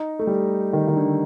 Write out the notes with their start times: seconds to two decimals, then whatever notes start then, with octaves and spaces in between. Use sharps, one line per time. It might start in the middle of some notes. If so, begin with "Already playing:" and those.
Already playing: D#4
0.19 A3
0.27 G3
0.73 D#3
0.88 D#3
0.96 D3